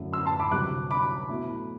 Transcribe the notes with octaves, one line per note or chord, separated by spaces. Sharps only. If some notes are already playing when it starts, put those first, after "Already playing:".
Already playing: F#2 D3 A3 E4
C6 E6
A5 C6
B5 D6
D2 C3 G3 D6 F#6
B5 D6
B2 A3 E4